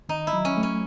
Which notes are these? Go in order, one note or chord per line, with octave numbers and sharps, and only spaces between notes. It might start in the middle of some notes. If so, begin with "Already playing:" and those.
D#3 D#4
E4
F#3
C#4
A3
C#4